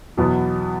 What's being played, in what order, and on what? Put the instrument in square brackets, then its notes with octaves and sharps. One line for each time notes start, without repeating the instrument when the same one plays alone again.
[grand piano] E2 B2 F#3 B3